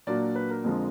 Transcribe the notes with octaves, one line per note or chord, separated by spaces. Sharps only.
A#2 F#3 A#3 D4 D5
B4
A#4
F2 D3 F3 G#3